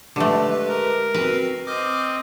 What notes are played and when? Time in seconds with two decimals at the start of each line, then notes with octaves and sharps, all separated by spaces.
0.16 D3 G#3 A3 G4 B4
0.68 A#4
1.14 C4 F#4 B4 C7
1.67 C4 D#5 D6 F6 G6